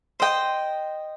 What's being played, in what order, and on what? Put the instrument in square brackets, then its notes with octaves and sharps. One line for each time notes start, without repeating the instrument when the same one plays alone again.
[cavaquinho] C5 D#5 G5